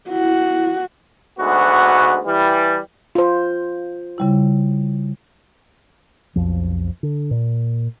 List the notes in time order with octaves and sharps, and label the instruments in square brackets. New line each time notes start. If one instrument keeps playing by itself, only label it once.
[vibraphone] E4 [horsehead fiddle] F#4
[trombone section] D2 G#2 B3 F#4
E3 G3
[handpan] F4 C5
[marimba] C#3 G3 E4
[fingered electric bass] B1 F2 F3
D3
A#2